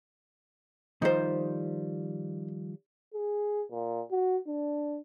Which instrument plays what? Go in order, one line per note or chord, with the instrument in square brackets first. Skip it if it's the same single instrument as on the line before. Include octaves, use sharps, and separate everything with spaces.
[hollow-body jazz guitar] D#3 F3 G3 [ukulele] D#4 C5
[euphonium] G#4
A#2
F#4
D4